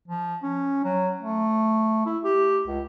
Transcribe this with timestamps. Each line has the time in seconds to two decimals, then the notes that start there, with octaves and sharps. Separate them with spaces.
0.08 F3
0.43 C#4
0.84 F#3
1.20 A3
2.06 E4
2.24 G4
2.68 C#2